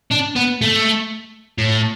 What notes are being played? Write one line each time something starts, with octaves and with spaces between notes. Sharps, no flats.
D4
B3
A3
A2